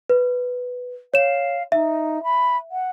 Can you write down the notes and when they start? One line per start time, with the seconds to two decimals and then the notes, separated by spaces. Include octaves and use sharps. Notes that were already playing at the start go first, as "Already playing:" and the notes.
0.10 B4
1.14 C#5 F5 E7
1.72 D#4 E5
2.23 B5
2.70 F#5